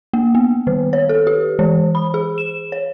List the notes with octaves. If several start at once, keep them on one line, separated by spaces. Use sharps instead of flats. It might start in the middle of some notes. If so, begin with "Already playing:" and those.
A#3
B3
D#3
C#5
A4
G4
E3
B5
G#4
E7
C#5